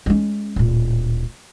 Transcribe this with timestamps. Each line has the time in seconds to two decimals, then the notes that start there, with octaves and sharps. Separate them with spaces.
0.06 G#3 C#4
0.56 D1 A#2